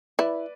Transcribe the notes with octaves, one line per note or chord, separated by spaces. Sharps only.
E4 B4 D5